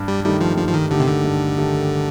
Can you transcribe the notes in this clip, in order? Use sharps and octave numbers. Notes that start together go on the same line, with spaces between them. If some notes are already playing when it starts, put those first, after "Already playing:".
Already playing: G2
G3
D#3 G3 A3 D#4 G4
F3
G2 F3
F3
D#3
D3 D#3 A3 D#4 G4
C3
D3
G2
D#3 A3 D#4 G4